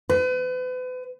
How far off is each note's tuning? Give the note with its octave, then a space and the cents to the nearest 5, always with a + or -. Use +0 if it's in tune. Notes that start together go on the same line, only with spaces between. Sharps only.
B4 +40